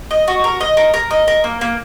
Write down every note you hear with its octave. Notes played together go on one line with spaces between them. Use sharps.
D#5
F#4
A#4
D#5
A#4
A#4
D#5
A#4
A#3
A#3